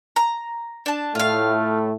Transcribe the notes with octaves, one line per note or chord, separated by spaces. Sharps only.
A#5
D4 A5
A2 A3 F4 F5